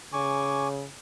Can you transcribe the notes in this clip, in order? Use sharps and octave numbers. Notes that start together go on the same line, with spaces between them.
C#3 G#5 C#6 D6